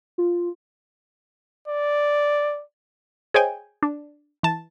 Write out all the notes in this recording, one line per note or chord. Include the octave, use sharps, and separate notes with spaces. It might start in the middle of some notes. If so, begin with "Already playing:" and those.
F4
D5
G#4 C5 C#5 D#5 G5 G#5
D4
E3 A5